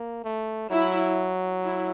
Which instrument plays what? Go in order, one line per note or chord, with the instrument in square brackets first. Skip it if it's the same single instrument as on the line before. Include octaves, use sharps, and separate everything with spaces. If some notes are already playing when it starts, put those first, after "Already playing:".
Already playing: [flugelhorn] A#3
A3
[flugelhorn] F#3 [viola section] E4
[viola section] E4